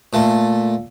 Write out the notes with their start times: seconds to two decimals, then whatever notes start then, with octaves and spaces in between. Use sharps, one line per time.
0.13 A#2 A3